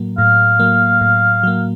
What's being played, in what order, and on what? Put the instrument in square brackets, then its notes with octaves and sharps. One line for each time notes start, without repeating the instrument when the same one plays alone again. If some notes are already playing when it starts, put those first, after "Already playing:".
Already playing: [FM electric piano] A2 F#3 A#3
[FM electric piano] A2 [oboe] F5
[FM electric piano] F#3 A#3
A2
F#3 A#3